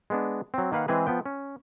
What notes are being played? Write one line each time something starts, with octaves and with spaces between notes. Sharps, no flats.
G#3 B3 D4
F#3 C4
D#3 A#3 B4 F5 F#5
E3 G#3 C4 G#4 B4
F3 B3 G5
C#4